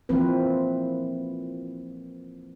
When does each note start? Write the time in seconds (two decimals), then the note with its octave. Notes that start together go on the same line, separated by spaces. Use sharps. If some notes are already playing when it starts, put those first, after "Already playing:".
0.09 E3 F3 A#3 C4 B4